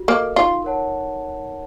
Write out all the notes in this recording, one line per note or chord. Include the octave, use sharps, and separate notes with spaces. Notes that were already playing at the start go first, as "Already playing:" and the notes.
Already playing: F#4
A#3 A4 D#5
D#4 F4
A#4 C#5 F#5 A5